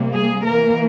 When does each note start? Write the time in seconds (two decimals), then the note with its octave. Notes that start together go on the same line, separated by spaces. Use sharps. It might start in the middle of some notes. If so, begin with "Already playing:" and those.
Already playing: C3 G3 A#3
0.13 G#4
0.45 E3 A#3 A#4